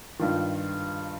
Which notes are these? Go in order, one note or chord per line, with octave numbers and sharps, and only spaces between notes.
G2 D#3 F4